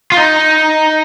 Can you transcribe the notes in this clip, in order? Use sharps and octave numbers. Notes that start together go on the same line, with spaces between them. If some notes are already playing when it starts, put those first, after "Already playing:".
F4
D#4